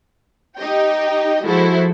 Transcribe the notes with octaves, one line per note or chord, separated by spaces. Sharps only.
D#4 G4 D#5 G5
F3 G#3 E4 F#4 A4 C5